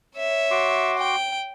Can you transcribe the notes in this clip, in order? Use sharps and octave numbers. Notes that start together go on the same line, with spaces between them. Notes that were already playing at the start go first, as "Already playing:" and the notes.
C#5 E5
F#4 C6 D6
G5